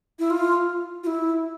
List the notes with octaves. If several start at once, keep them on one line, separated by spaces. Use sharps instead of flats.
E4
F4
F4
E4